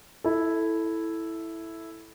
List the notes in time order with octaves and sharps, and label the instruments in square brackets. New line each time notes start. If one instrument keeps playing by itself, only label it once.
[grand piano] E4 A4